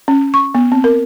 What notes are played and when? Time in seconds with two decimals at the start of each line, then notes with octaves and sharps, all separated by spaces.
0.08 C#4
0.34 C#6
0.55 B3
0.72 C4
0.84 A#4